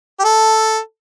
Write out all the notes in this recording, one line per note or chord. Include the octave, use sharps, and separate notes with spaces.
G4
A4